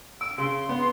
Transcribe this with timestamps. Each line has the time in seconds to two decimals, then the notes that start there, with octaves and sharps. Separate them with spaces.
0.21 E6 D7
0.38 C#3 C6
0.69 B3